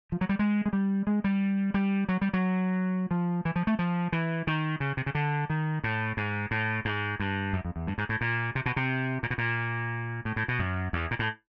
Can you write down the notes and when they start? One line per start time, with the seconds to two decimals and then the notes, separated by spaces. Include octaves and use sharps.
0.12 F3
0.21 F#3
0.29 G3
0.39 G#3
0.66 G#3
0.73 G3
1.07 G#3
1.24 G3
1.74 G3
2.09 F#3
2.21 G3
2.33 F#3
3.11 F3
3.45 E3
3.56 F3
3.67 A3
3.79 F3
4.12 E3
4.47 D#3
4.80 C#3
4.97 C3
5.06 C#3
5.15 D3
5.50 D#3
5.84 A2
6.17 G#2
6.51 A2
6.85 G#2
7.20 G2
7.53 F#2
7.65 F2
7.76 E2
7.87 G2
7.98 G#2
8.09 A2
8.21 A#2
8.55 C3
8.66 B2
8.76 C3
9.23 A#2
9.30 B2
9.38 A#2
10.25 A2
10.36 A2
10.48 B2
10.59 F#2
10.93 E2
11.11 A#2
11.19 A2